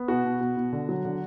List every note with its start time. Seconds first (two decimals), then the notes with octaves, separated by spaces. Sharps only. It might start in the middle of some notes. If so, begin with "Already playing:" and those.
Already playing: B3
0.08 B2 F#4
0.25 B2
0.41 B2
0.57 B2
0.73 D3
0.89 F#3
1.05 D3